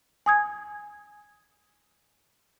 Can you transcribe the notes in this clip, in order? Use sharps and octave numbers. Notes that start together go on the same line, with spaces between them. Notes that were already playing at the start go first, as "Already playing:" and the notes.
G#5 D#6 G#6